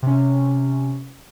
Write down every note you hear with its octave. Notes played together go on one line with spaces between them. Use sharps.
C3 C#4